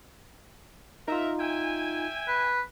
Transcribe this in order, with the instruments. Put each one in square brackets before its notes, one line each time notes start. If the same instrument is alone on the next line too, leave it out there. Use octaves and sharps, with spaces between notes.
[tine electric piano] D#4 F4 [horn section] A#4 E5
[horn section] E5 G5 G#5
[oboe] B4